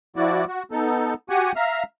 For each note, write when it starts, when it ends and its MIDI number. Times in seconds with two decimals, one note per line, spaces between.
0.16 0.45 53
0.16 0.45 64
0.16 0.45 66
0.16 0.45 74
0.47 0.63 66
0.71 1.14 59
0.71 1.14 63
0.71 1.14 69
1.29 1.52 66
1.29 1.52 67
1.29 1.52 78
1.29 1.52 80
1.56 1.83 76
1.56 1.83 77
1.56 1.83 82
1.56 1.83 89